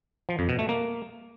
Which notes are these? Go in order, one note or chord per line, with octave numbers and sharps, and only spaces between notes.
F3
F2
B2
A3
A#3